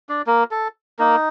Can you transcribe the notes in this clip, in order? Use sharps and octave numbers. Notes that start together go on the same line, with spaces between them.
D4 D5
A#3 A#4
A4
A#3 D#4 A#4